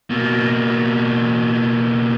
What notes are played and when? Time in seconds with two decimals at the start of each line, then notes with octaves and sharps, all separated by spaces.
0.10 B2 A#3